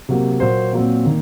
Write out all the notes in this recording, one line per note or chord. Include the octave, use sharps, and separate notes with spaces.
C3 F#3 A#3
A#2 F#3 A#3 C5
A#2 F#3 C4
D#3 A#3